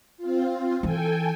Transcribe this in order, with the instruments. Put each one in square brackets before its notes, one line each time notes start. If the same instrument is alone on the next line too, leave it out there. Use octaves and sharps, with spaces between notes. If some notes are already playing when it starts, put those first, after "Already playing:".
[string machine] C4 F4
[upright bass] E3 [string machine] A4 G5 G#5